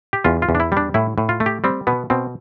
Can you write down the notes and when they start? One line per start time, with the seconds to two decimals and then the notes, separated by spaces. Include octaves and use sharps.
0.13 G4
0.25 E2 F4
0.42 F4
0.49 E2
0.55 D4
0.60 E4
0.72 G3 D4
0.94 A2 E4
1.18 A2
1.29 F4
1.40 A3
1.46 G4
1.64 G3 C4
1.87 B2 B3
2.10 B2 C4